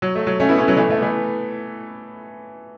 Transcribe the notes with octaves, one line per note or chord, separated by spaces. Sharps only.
F#3
A3
F#3
A3 C#4
B3 E4
A3 C#4
F#3 B3
E3 A3
E3 A3
B3
E3 A3